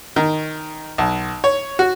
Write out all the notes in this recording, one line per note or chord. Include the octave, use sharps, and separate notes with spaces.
D#3
B1
C#5
F#4